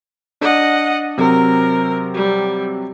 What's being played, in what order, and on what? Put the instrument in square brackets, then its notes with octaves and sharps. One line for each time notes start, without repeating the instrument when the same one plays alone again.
[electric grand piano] D4 [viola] D#5 F#5
[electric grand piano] C3 F#3 C4 [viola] A#4
[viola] G3